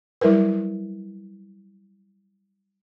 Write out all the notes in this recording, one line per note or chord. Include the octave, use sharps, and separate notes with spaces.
F#3 G3 E4 A#4 B4